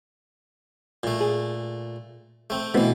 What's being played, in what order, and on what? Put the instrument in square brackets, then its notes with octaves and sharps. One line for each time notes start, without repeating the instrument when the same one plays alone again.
[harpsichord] A#2 A3
[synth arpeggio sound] G#4
[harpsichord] A3 C4
[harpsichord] B2 E3 [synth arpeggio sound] A3 B3 C4